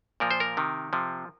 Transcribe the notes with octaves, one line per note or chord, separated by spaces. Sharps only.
A#2 F3 A#4
C5
A#4
C3 D#3
C3 F3